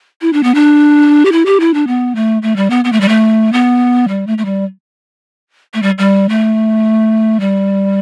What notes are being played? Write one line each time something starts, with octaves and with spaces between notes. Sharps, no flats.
E4
D4
B3
D4
G4
E4
G4
E4
D4
B3
A3
A3
G3
B3
B3
A3
G3
A3
B3
G3
A3
A3
G3
A3
G3
G3
A3
G3